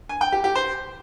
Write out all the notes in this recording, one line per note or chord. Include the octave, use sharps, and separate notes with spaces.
G#5
G5
G4
G4
C5